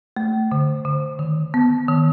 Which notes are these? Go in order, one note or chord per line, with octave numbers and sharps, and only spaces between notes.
A3
D3
D3
D#3
B3
D#3